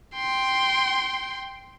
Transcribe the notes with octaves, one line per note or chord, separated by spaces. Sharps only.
G5 C6